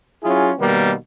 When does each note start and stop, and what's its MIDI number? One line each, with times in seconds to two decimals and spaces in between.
0.23 0.50 54
0.23 0.50 61
0.23 0.50 64
0.23 0.50 65
0.23 0.50 68
0.58 0.92 47
0.58 0.92 51
0.58 0.92 55
0.58 0.92 58
0.58 0.92 59